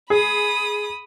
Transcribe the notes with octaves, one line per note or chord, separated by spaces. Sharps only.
G#4 B5 D#6